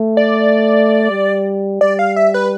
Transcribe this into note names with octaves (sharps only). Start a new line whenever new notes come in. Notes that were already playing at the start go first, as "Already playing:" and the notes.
Already playing: A3
D5
G3
G3 D5
F5
E5
B4